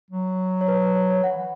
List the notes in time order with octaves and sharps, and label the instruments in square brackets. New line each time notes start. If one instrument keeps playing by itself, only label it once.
[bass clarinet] F#3
[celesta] C#5
B4
B4
C#5
C#5
[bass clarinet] E3 [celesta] F#5
[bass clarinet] E3